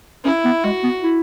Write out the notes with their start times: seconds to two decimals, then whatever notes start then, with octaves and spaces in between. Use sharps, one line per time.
0.24 C#4 E4
0.45 B3
0.64 G#3 F#4
0.83 B3
1.03 E4